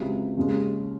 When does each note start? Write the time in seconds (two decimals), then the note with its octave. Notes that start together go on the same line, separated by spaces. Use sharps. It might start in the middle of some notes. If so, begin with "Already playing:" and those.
Already playing: C#2 C3 F#3 C#4
0.37 D#2 C#3 G#3